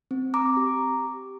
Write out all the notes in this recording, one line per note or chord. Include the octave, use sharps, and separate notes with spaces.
C4
A#5 D6
G4